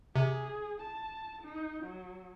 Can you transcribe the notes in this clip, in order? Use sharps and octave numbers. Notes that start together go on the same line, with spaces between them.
C3 G#4
A5
D#4
F#3